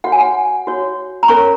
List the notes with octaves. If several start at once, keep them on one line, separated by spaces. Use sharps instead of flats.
F#4 C#5 F#5
G#5
F#5
F#4 C#5
A#5
C#4 A#4 C#5 C#6